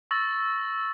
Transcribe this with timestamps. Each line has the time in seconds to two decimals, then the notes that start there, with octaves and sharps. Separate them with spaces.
0.11 C#6 E6 A6 A#6 F#7